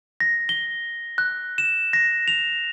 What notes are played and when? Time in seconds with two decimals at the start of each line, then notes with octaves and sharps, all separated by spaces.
0.20 A#6
0.49 G7
1.18 F#6
1.58 E7
1.93 A#6
2.28 F7